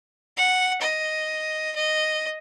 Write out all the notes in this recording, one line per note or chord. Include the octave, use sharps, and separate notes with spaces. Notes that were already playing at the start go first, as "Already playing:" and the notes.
F#5
D#5
D#5